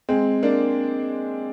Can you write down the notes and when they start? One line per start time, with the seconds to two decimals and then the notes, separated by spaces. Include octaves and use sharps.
0.09 G#3 C4
0.43 A#3 D4